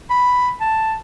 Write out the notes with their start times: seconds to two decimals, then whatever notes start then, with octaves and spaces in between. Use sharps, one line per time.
0.10 B5
0.60 A5